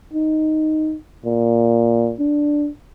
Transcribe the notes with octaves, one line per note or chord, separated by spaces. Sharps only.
D#4
A#2
D4